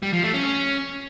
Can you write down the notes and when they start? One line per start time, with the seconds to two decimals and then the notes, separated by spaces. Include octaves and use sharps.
0.03 G3
0.13 F3
0.23 A3
0.34 C#4
0.44 C#4